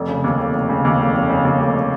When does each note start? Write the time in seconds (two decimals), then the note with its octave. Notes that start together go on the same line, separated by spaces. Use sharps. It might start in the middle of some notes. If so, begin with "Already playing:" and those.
Already playing: F1
0.09 C#3
0.24 D#2
0.39 F1
0.54 F1
0.69 C#3
0.85 D#2
1.00 F1
1.14 F1
1.30 C#3
1.45 D#2
1.60 F1